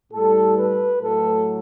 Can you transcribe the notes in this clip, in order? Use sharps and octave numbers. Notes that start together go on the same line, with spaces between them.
A2 G3 A4
B4
A2 F#3 A3 A4